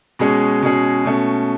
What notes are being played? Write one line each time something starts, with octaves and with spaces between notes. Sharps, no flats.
B2 G#3 C#4 G#4
B2 G#3 C#4 G#4
B2 A3 C#4